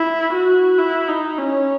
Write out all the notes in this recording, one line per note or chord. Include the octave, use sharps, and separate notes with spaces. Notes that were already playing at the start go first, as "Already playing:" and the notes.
Already playing: E4
F#4
E4
D#4
C#4